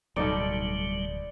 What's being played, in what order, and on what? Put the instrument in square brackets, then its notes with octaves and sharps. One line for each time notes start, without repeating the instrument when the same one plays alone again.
[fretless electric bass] D1 [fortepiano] B1 A3 D#4 [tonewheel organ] F#3 G3 [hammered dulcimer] D5